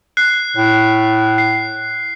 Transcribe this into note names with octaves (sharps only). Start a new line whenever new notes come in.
F#6 C7
A2
C7